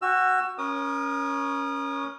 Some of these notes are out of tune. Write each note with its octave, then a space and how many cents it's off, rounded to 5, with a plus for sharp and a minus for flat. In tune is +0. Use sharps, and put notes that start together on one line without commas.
F#4 +0 G5 +35 E6 +25
C#4 +5 A#4 +35 D#6 -25